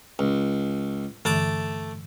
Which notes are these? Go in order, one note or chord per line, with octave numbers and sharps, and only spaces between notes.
C#2
G2 D3 E3 A3 A5 D6